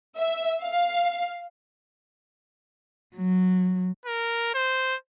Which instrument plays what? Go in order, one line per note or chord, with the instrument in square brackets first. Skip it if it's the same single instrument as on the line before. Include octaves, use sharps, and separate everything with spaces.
[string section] E5
F5
[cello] F#3
[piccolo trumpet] A#4
C5